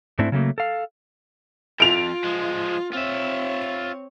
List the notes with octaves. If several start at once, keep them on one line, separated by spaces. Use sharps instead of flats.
G#2 A3 C4 D4 E4
C#3 F#3 A3 A#3
A4 F5
F2 F4 D7 F7
F3 G#3
C4 F4 C#5 E5